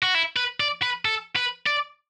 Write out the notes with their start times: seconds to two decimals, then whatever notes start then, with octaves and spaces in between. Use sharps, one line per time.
0.02 F#4
0.15 E4
0.36 B4
0.60 D5
0.82 B4
1.05 A4
1.36 B4
1.67 D5